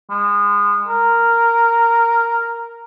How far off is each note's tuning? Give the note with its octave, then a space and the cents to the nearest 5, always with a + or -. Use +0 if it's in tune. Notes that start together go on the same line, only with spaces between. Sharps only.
G#3 -30
A#4 -5